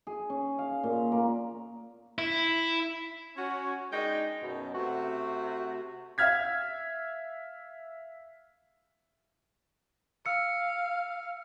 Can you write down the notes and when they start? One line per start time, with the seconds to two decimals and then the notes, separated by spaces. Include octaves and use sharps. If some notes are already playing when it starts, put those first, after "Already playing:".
0.07 G#4
0.30 C#4
0.58 F5
0.83 A#2
1.12 A#3
2.19 E4
3.36 C#4 F#4
3.91 G#3 D4 D#4 G5
4.41 F#2 B2
4.74 C3 A3 F#4
6.18 E5 F5 F6 G#6 B6
10.26 F5 E6 C#7